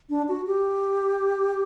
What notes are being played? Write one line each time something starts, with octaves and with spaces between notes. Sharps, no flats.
D4
F#4
G4